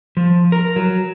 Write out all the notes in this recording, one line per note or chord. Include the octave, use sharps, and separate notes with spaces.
F3
A#4
F#3